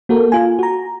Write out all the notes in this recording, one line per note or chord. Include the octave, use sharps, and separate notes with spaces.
A#3 F#4 A4 A#4
F4 G#5
F#4 A#5